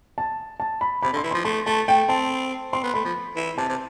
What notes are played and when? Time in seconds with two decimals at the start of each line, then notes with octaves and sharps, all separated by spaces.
0.18 A5
0.60 A5
0.81 B5
1.03 C3 B5
1.13 D3
1.17 C6
1.23 E3
1.31 F3 C6
1.45 A3 C6
1.66 A3 A5
1.88 A3 G5
2.08 C4 A5
2.72 C4 C6
2.83 B3
2.94 A3 B5
3.05 F3
3.36 E3
3.57 C3 A5
3.69 C3